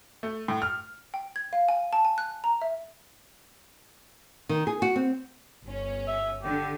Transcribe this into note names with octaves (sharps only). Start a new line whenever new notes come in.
A3
A2
F6
G5
G#6
F5
G#5
A5
G#5
F#6
A#5
E5
D#3
G#4
F#4
C4
G1 C#4
E5
D3 G4